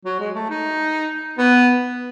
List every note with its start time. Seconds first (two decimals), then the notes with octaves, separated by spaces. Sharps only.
0.05 F#3
0.19 G#3
0.35 A3
0.49 D#4
1.38 B3